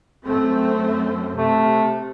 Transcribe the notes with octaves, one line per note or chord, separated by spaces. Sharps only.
F#2 A3 C4
C3 A3